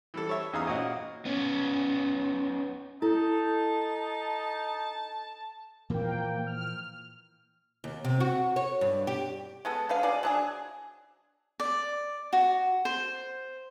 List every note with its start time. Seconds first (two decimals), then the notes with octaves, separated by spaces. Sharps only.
0.14 E3 G3 A4
0.29 C#5 E5
0.53 E2 D#4 G#4 F5 A#5 D#6
0.67 A#2 C#4 F#4 D#5
1.25 B3 C#4
3.02 D#4 E4 A4 A5
5.90 A#2 E3 F3 A#3 G5
6.47 F6
7.84 D#2
8.05 C3
8.20 F#4
8.56 C#5
8.81 G2
9.07 G4
9.65 G#3 B3 A4
9.89 D3 B4 F5
10.03 B2 G#4 D5
10.23 F#3 D4 G#4
11.60 D5
12.33 F#4
12.85 C5